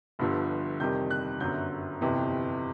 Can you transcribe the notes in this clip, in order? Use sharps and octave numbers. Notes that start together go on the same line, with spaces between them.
G1 G2 D3 F3
F2 C3 D#3 G3 G6
F#6
G1 F#2 D3 F#3 G6
G1 F2 C3 E3